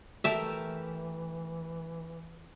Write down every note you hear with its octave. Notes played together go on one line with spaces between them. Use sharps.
E3 A3 G4 A#4 E5 A5